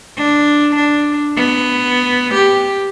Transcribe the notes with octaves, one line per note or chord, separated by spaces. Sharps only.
D4
D4
B3
G4